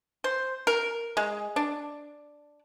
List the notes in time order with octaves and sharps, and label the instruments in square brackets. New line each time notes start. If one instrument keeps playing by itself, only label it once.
[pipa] C5
A#4
G#3
D4